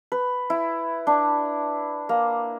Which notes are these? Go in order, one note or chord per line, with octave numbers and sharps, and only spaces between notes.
B4
E4
D4
A#3